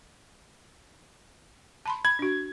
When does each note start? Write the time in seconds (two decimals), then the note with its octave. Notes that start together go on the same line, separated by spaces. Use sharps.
1.86 A5 B5 C6
2.05 B5 G#6
2.19 D4 F#4